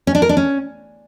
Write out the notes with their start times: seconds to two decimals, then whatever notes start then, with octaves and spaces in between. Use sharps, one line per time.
0.07 C#4
0.15 D4
0.22 A#4
0.29 D4
0.37 C#4